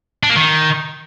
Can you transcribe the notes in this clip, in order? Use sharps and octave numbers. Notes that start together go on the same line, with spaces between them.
D4
A#3
D#3